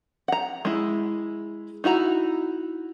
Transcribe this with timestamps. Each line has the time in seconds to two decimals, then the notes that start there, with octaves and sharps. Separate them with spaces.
0.28 F#5 A#5
0.65 G#3 E4
1.84 D#4 E4 F#4 A#5